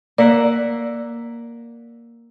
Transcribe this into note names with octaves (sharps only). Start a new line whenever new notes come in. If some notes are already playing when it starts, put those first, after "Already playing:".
A#3 D5 E5 F#5